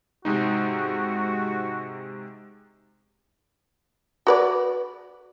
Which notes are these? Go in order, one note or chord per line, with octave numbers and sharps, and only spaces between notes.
G#2 C3 G#3 D#4 F#4
F#4 B4 D5